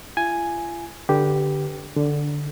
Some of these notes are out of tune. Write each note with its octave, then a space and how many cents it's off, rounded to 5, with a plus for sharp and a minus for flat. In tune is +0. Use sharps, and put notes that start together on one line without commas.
F4 -45 G#5 +0
D3 +0 G4 +0 B4 -15
D3 +0 D4 -20